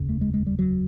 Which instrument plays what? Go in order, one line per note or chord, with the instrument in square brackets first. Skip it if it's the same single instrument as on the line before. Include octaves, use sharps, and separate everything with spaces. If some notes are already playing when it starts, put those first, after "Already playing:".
Already playing: [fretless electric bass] F1 D#2 C#3
A3
G#3
G#3
G3
F#3